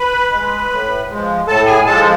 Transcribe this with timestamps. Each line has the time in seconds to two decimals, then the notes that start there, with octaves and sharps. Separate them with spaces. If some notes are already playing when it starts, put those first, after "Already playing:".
Already playing: B4 B5
0.32 G#3
0.71 A2
1.09 F3 G#3
1.47 A2 A4 A5
1.66 G#4 G#5
1.86 F3 G#3 A4 A5